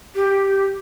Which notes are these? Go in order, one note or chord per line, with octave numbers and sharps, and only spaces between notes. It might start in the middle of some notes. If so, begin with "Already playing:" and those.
G4